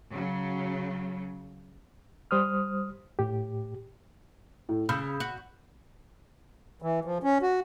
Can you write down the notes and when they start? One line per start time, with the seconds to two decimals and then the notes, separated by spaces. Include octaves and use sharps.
0.11 C#3 F#3
2.31 G3 C5 D#6 F6
3.19 A2 G4
4.69 A2
4.89 C#3 B5 E6 G6
5.20 F#4
6.82 E3
7.05 F3
7.24 C#4
7.42 F#4